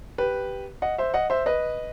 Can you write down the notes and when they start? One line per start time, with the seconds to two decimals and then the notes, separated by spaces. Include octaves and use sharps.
0.18 G4 B4
0.82 D#5 F#5
0.98 C5 E5
1.14 D#5 F#5
1.30 C5 E5
1.46 B4 D#5